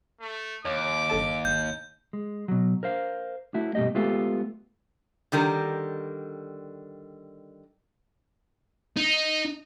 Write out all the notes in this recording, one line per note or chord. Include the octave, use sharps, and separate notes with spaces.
A3
D#2 C#5 D6
G1 A4 A5
G#1 G6
G#3
B2 F#3
A#4 C5 F5
A3 E4 F#4
G2 B2 A3 G4 D#5
G#3 A3 B3 F4 G4 A4
D3 D#3 G3 A#4
D#4